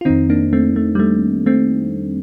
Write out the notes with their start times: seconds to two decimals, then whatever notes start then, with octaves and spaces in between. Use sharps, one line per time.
0.01 F4
0.05 F2 D#3 C4 D#4
0.30 A#3 D4
0.53 A3 C4
0.76 A3
0.95 G3
0.99 A3
1.46 A3 C4